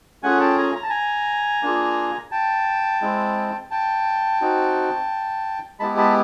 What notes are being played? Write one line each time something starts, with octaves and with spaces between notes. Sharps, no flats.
A3 C#4 F4 G#4 F#5 G#5
G5 A5
G#5 A#5
A#5
A5
G#5 A#5
A#3 D4 F4 G#4
G5 A5
G#3 C4 E4
G5 A5
C4 D#4 F#4
G#3 B3 E4 G4 A5 B5
A5 B5